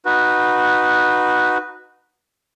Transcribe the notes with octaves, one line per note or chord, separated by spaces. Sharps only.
D#4 F#4 B4